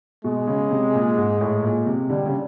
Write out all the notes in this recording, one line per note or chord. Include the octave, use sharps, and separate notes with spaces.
B2 G#3
C#3
C3
A#2
G#2
A2
A#2
C3
D3 G3
C#3